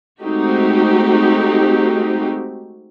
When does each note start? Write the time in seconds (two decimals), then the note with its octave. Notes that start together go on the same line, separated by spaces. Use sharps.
0.21 G#3 A3 C4 D#4 F#4 G4